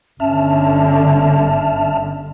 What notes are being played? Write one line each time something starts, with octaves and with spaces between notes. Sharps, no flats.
G1 D3 C#4 E5 A5 F6